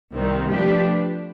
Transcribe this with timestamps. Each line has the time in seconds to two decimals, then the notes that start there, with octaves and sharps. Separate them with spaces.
0.13 C2 C3 D#3 G3
0.49 F3 A3 D4 G4 B4